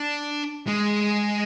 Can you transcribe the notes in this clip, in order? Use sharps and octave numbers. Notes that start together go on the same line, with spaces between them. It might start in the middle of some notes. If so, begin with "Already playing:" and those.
Already playing: D4
G#3